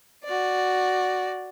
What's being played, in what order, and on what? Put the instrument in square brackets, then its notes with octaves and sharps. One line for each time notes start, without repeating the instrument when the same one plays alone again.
[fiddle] F#4 D5